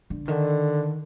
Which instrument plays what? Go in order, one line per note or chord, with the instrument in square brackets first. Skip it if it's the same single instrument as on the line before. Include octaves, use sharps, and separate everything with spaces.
[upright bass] D3
[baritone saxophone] D3 [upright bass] D#3